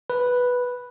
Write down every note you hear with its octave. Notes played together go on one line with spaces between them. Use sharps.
B4